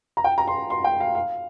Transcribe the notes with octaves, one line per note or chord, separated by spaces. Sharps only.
A#5
G5
A#5
C6
C6
G5
F5
F5